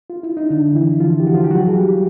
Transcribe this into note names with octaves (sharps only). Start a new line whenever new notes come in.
F4
E4
D#4
D3 D4
E3 E4
F3 F4
G4
F#4
F3 F4
G4
F#3 F#4
G#4
G3 G4